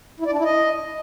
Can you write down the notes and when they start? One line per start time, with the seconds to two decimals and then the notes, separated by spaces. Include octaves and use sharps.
0.20 E4
0.26 D5
0.32 D4
0.38 E4
0.45 D#5